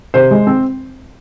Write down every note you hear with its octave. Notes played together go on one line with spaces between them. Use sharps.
C3 C5
G#3
C4